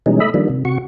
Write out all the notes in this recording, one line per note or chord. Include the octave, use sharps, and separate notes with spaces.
B2 E3 G3 G#3 C#4 D#4
A3 D#5 E5 B5
D#3 F3 G3 A#3 D4
C3
C3 F#4 C#6